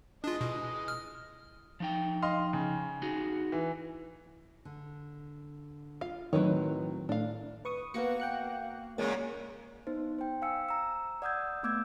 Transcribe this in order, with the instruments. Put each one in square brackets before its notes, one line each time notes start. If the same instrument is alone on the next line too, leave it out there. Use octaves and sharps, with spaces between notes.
[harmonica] E3 G#3 D#5 [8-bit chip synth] D4 F4
[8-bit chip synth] B2
F6
[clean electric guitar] F3 D#4 G5
[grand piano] D#5 F5 C6
C#3
[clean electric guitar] D#4 F#4 G#4
[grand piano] E3
[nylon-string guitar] D3
[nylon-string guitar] F4 [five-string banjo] F5
[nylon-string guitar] A2 F#3 C4 [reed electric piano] D#3 [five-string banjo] E4 B4 C#5
[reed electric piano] A2 [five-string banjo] D4 F5
[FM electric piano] B4 C#6 D#6
[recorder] A#3 [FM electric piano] B3 C#7 [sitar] F#4
[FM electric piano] G5 F#6 C#7
[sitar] A#2 C#3 F#3 [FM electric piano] G#3 A#3 [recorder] C#5
[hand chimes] B3 D#4 C5
C5 G5
F5 G#5 E6 C#7
A#5 E6
D5 F#5 D#6 E6 G6 G#6
A3 B3 D6 E6 G6 G#6